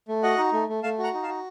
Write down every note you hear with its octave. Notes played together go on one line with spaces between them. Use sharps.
A3
F#4 D#5 F#5
D#4
A3
A3
A3 F5 A5
F#4
F#5 A#5
D#4
F5 A5
F#4